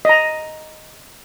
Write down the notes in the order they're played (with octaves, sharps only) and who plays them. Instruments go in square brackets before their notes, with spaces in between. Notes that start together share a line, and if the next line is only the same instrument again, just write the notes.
[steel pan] D#5 A#5